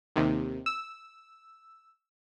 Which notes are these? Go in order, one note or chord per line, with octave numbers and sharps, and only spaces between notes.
D#2 C3 D#3
E6